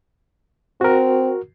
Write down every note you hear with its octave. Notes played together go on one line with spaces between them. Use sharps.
C4 F#4 A#4